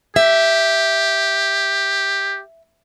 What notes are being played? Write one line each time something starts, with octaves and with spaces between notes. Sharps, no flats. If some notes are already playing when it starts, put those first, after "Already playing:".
G4 E5